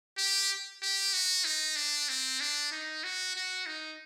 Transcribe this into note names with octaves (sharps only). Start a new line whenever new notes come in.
G4
G4
F#4
D#4
D4
C4
D4
D#4
F#4
F#4
D#4